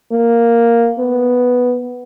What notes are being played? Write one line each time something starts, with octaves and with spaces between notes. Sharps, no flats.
A#3
B3